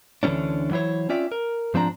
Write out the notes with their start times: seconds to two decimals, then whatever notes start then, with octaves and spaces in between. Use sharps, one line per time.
0.23 D2 D3 E3 F#3 C#4 D4
0.71 E3 F#3 E4 C5 C#5
1.09 C4 C#4 F4 D5 E5 G5
1.32 A#4
1.74 G#2 F3 C4 D4 A#5